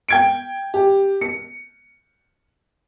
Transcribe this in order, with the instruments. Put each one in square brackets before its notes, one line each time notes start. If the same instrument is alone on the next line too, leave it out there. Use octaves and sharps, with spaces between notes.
[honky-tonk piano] G5 G#6 D7
G4
C#7